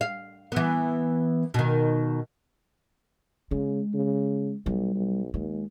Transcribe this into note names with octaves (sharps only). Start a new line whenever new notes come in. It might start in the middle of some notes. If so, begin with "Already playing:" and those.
F5
E3 B3
B2 D#3
C#3 G#3
C#3
B1 G3
B1
D#2 G#3